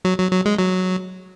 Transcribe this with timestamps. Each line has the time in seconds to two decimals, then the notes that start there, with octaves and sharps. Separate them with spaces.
0.05 F#3
0.18 F#3
0.31 F#3
0.45 G#3
0.59 F#3